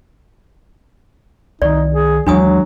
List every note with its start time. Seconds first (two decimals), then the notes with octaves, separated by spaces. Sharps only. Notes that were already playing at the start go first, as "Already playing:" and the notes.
1.62 C2 D#3 D#4 D5
1.94 G#4
2.27 D#2 E3 F#3 G#3 D4 G#5 D#6